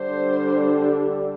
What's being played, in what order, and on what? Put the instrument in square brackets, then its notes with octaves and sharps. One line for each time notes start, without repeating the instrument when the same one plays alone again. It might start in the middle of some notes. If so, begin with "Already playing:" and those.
Already playing: [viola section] D3 G3 D4 C5